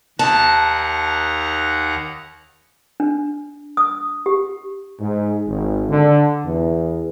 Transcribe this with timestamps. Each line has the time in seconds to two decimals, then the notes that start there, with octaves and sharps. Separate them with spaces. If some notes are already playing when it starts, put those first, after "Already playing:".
0.19 D#2 F#5 A5 A#5
3.00 D4
3.77 D#6
4.26 G4
5.00 G#2
5.48 G#1
5.90 D3
6.45 E2